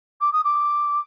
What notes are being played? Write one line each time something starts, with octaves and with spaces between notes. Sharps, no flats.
D6
D#6
D6